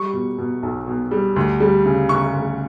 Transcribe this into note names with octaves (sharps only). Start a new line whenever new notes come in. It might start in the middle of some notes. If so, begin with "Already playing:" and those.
Already playing: G3 C#6
B2
B2
B1
B2
G3
D2
G3
C#3
C#3 C#6
D2